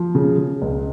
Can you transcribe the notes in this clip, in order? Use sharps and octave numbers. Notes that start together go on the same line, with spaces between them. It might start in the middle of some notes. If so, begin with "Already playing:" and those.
Already playing: F3
C#3
C#3
C#2